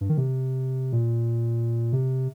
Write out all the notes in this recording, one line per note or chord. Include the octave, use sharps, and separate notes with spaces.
G2
D#3
C3
A#2
C3